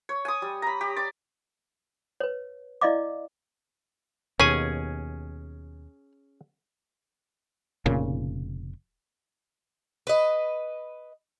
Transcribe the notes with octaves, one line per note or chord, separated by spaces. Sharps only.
C#5
G#5 D#6
G3
A#5 B5
G4
D5 D6
B4 C#5
E4 D5 D#5 F5 D6
D#2 B2 C#4 G#4 C#5 G#5
F1 A#2 C#3
B4 D#5